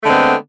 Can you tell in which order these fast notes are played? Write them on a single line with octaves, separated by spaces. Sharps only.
A3 D3 G#3 C4 B3